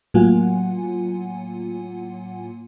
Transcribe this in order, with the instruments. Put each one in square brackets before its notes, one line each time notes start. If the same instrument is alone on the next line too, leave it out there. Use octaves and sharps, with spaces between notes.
[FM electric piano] A2 F#3 A#3 F4 F#5 G#5